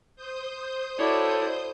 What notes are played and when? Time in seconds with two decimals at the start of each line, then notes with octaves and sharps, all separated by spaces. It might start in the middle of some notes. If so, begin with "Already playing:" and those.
0.16 C5 D#6 G6
0.99 E4 F#4 A4 C#5 D5